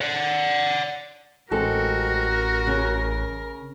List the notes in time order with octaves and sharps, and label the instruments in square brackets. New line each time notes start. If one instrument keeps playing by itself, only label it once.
[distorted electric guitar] D5 F#5
[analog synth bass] A1 [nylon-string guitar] G#3 C4 A4 [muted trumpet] F#4 [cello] A#4
[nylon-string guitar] C#3